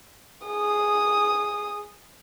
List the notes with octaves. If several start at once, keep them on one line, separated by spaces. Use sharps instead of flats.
G#4 D#6